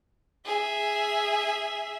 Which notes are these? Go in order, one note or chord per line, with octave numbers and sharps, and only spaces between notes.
G#4 E5